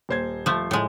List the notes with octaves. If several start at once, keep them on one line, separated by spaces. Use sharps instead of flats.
D#1 C5 G#6
F3 A3
A2 G#3